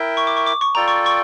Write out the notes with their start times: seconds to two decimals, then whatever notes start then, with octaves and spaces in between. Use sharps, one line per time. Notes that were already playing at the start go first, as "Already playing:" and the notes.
Already playing: E4 A#4 E5 G5
0.17 C#6
0.27 D6
0.37 C#6
0.46 D6
0.61 C#6
0.75 F4 A4 D5 G5 A#5
0.88 C#6
1.06 C#6